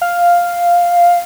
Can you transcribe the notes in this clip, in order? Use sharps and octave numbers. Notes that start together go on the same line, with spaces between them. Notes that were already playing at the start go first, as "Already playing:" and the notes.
F5